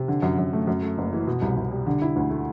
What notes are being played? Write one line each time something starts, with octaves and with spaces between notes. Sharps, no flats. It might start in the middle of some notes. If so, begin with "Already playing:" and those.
Already playing: C3
D3
F#2
F#2
A3
F#2
A3
F#1
E3
B2
C2
C2
G3
D3
E4
D2
A3